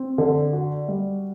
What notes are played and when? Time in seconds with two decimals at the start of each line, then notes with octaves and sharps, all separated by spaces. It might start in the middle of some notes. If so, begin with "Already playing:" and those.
Already playing: C4
0.18 D3
0.53 F#4
0.88 G3